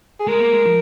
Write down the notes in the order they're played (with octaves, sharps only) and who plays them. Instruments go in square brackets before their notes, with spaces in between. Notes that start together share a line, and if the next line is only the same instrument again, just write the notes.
[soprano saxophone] G#4
[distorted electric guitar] G#3 [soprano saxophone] A#4
[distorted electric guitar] A#3
G#3
F3